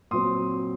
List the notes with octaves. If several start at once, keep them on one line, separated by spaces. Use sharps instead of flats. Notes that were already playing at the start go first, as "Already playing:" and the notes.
A#2 F#3 C4 C6 D#6